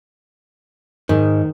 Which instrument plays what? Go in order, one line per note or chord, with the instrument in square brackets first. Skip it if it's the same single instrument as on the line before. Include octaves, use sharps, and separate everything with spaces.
[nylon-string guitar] G#2 [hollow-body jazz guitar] D#3